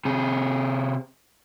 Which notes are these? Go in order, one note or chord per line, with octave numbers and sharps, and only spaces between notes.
C3 G#4